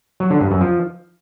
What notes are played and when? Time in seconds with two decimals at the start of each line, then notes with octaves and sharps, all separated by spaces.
0.20 F#3
0.30 D3
0.41 G2
0.51 F#2
0.61 F3